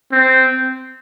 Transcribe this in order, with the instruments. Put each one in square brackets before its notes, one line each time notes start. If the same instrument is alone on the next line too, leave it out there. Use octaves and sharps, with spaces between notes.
[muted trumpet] C4